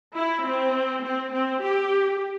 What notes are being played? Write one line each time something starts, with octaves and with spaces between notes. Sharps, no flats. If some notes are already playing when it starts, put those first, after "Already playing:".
E4
C4
C4
C4
G4